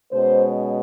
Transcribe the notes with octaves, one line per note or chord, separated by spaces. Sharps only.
B2 G#3 C#4 C5